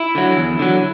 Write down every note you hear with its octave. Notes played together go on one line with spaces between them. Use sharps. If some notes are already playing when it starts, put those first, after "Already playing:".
Already playing: E4
D3 F#3
E2
D3 F#3